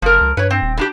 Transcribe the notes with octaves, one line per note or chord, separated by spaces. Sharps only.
F#1 F3 A#4
C#2
G2 B4 C#5
C4
D#1
D3 D4 G4